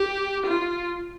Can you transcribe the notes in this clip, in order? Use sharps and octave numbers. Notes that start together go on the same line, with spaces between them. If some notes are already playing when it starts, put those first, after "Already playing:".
Already playing: G4
F4